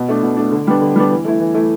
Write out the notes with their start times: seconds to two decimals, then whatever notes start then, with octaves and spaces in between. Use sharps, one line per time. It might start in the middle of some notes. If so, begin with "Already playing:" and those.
Already playing: B2
0.08 A3 D4
0.23 B2
0.37 A3 D4
0.52 D3
0.67 G3 B3 D4
0.81 D3
0.96 G3 B3 D4
1.11 E3
1.25 A3 E4
1.40 E3
1.54 A3 E4